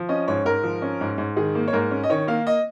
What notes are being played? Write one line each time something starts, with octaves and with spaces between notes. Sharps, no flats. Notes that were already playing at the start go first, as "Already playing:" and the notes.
Already playing: F3
C#4 D#5
G#2 C#5
G#2 A#4
F3
C#4
G#2
G#2
D#3 G#4
A#3
C#5
G#2 A#4
C#4
D#5
D#3 C#5
A#3 F5
D#5